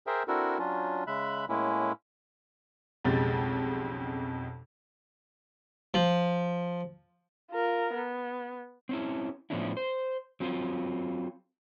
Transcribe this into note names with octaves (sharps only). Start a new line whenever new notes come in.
G#4 A#4 C5 E5 G5
C4 D4 E4 F#4 A4 A#4
F#3 C#4 D4 F4
C#3 G#3 E5 B5 F#6
A2 G#3 A#3 C#4 E4
B1 F2 C#3 G#3 G4 A6
F3
F4 A#4
B3
C4 C#4 E4
A2 F3 B3 C#4 D4 E4
C5
F#3 C4 F4